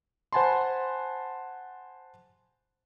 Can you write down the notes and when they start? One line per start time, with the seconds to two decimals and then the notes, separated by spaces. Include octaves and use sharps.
0.33 C5 F#5 G#5 A5 B5 C6